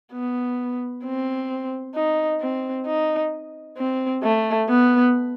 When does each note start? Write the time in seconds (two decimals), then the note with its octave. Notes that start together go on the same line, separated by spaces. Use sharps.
0.13 B3
1.04 C4
1.95 D#4
2.41 C4
2.86 D#4
3.78 C4
4.23 A3
4.69 B3